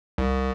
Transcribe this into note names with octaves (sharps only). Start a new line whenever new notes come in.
C2